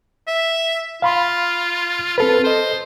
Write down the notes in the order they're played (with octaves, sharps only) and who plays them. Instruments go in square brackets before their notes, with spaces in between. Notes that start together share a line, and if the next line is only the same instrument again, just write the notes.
[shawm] E5
[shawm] F4 [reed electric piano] F5 B5 C6
[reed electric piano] C4 A4 B4 [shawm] F4
[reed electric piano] A4 D#5 [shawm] C5